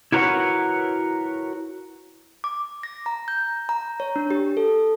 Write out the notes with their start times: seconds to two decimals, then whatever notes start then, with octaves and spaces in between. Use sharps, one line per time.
0.12 E4 F#4 A#4 B4 C#5 F#5
2.44 D6
2.83 A#6
3.06 A#5
3.28 G6
3.69 A#5
4.00 C#5
4.16 D4
4.30 G4
4.57 A4